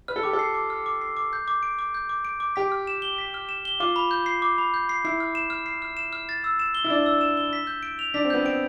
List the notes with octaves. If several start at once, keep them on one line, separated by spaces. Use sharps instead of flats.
B4 F6
A4
G4 D6
A4
C7
D6
F6
D6
C7
D6
G6
D6
D7
D6
G6
D6
D7
D6
G4 B6
F6
E7
G7
B6
F6
E7
G7
F4 D6
B5
G6
C7
D6
B5
G6
C7
E4 C7
F6
E7
F6
C7
F6
E7
F6
A6
E6
E7
G7
E4
D4 A6
E6
E7
G7
B6
G6
D7
F7
D4 B6
C4
B3 G6
C4 D7